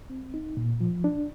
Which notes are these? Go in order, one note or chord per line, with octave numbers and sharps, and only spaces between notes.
C4
D#4
A#2
F3
D4